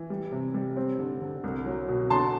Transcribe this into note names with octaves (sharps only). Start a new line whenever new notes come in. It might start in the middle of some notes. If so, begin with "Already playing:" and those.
Already playing: E3
G3
C3
G3
C4
D3
D3
C2
F#3
B2
D3 A5 C6